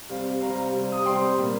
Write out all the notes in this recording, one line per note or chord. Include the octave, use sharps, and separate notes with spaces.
C3 G3 C4 F5
C3 G3 C4 F5 A#5
C3 G3 C4
D#6
C3 G3 C4 G5 C6
A#2 G3 A#3